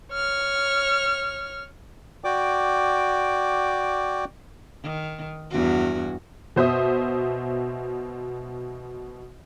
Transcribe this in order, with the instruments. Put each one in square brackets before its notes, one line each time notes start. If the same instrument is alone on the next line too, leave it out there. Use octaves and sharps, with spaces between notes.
[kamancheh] C#5 F6
[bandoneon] F#4 D5 G5 D6
[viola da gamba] D#3
E2 G2 F#4
[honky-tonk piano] B2 C5 E5 D#6